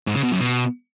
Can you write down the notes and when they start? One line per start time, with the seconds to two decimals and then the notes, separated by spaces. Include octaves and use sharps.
0.07 G#2
0.15 C#3
0.23 B2
0.32 F#2
0.40 B2